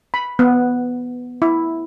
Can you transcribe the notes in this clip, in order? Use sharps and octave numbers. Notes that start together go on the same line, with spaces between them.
B5
B3
E4